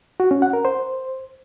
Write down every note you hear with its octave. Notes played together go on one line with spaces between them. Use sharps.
F#4
C#4
F#5
A#4
C5